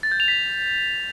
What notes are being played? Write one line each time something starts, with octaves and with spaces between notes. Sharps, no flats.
A6
G6
F7
B6